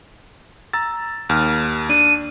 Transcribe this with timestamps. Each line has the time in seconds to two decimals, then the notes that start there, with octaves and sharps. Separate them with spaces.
0.73 A#5 E6 A6
1.29 D#2 F6
1.89 D4 D#7